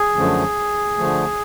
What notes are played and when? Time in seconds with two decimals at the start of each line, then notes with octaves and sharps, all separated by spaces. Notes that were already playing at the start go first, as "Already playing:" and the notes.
Already playing: G#4
0.15 F#2 D3 F3 A3
0.97 D3 F3 A3